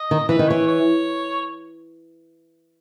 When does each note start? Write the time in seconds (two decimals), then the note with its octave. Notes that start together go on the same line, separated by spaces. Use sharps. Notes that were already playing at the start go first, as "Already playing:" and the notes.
Already playing: D#5
0.11 D#3
0.29 E3 B4
0.39 D#3
0.48 E3 C#5
0.67 C#5